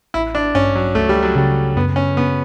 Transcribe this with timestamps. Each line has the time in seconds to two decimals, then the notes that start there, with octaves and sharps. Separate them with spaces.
0.14 A1 E4
0.35 D4
0.55 G2 C#4
0.76 F#3
0.95 C#2 A3
1.09 G3
1.23 F#3
1.35 C#3 G3
1.76 F#2 B3
1.96 C#4
2.17 C#3 B3